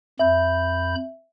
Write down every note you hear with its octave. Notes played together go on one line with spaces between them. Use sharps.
F2 E5 B5 G6